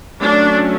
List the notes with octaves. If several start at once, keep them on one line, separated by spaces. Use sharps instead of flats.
F#3 A3 C#4 D4